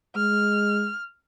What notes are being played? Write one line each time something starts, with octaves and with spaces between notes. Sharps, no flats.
G#3 F6